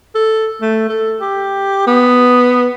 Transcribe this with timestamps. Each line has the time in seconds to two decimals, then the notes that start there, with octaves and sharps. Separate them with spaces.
0.15 A4
0.61 A3
0.89 A4
1.21 G4
1.87 B3